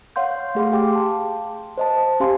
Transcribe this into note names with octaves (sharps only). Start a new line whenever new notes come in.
C#5 F5 F#5 C6 G6
A3 G#4 F5 C6
G4 G5 D6
A5
C5 D#5 A5
C#4 G4 F5 G#5 C6